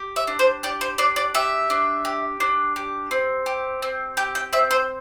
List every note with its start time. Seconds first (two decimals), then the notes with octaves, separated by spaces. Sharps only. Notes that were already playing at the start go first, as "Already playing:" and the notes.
Already playing: G4
0.16 E5
0.27 D4
0.39 C5
0.63 G4 D5
0.81 C5
0.98 D4 D5
1.16 D5
1.34 G4 E5
1.70 D4
2.05 G4
2.40 D4
2.76 G4
3.11 C4
3.46 G4
3.82 C4
4.17 G4 G5
4.35 G5
4.53 C4 E5
4.71 C5